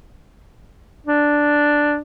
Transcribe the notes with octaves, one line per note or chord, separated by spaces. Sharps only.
D4